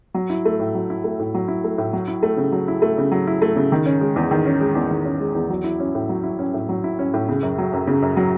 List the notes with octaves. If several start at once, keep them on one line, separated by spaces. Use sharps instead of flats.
F#3
E4
A3
A2
F#3
E4
A3
A2
F#3
E4
A3
A2
F#3
E4
A3
C#3
F#3
E4
A3
C#3
F#3
E4
A3
C#3
D#3
C#4
G#3
E2
D#3
C#4
G#3
E2
D#3
C#4
G#3
E2
F#3
E4
C#4
A2
F#3
E4
C#4
A2
F#3
E4
C#4
A2
C#3
F#2
F#3
F#2
C#3
F#2
F#3